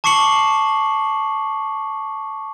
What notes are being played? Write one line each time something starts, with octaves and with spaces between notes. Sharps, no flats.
A5 C#6 D6 C7 C#7 F#7